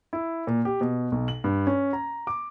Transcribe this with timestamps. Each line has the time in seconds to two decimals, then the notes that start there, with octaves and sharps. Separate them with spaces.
0.13 E4
0.47 A#2
0.65 G4
0.81 B2
1.12 B1
1.28 F#7
1.44 G2
1.67 C#4
1.93 A#5
2.27 D6